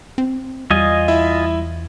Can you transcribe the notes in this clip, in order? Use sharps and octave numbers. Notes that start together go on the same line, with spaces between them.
C4
E2 G3 F4 D#5 G#5
E4 E5